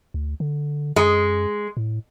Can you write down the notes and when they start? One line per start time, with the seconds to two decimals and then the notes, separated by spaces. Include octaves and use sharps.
0.14 D2
0.40 D3
0.96 F#2 G#3
1.77 A2